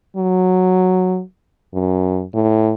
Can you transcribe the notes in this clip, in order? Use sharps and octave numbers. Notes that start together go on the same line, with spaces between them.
F#3
F#2
A2